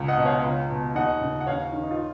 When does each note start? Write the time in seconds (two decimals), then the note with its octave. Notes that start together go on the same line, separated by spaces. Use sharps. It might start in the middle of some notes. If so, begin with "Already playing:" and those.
Already playing: C#2
0.08 D#5 F#5
0.17 B2
0.25 C#5 F5
0.44 C#2
0.70 B2
0.95 D#2 D#5 F#5
1.21 C#3
1.40 F#5
1.47 D#2 C#5 F5
1.73 D#3
1.83 D#4
1.91 F4